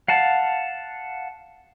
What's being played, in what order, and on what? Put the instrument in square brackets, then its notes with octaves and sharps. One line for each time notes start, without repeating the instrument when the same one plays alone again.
[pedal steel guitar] F5 F#5 A5